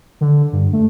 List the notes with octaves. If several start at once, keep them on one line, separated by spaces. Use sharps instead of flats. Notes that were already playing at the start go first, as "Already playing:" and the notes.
D3
G2
A3